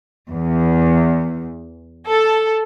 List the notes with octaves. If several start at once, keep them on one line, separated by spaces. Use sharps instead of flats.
E2
A4